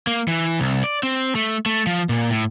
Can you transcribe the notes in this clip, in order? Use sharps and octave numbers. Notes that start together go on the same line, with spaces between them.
A#3
E3
C2
D5
C4
A3
A3
F3
A#2
A2